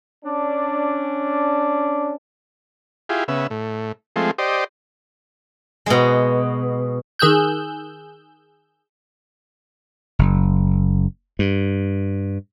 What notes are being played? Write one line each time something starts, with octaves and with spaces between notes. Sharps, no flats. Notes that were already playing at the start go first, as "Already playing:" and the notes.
C#4 D4
E4 F4 G4 G#4
C#3 B3 E5
A2
F3 G#3 A3 C4
G4 C5 D5 D#5
B2 G#3
D#3 G#4 E6 F#6 G6
F#1
G2